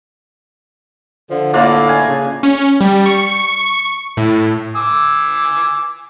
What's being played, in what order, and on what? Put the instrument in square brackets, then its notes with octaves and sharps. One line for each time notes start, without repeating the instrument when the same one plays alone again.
[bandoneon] D3 [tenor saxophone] F3
[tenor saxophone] A2 [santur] A#3 D4 F4
[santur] G#5
[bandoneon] C#3
[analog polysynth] C#4
G3
C#6
A2
[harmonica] G#5 D6 E6